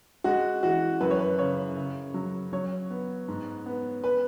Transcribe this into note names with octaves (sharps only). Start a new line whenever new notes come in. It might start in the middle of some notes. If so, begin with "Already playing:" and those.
G#3 F#4
E3 F#4
F#2 B4
C#5
B4
C#3 C#5
C#3
F#3
F#3 C#5
B3
G#2
B3
B4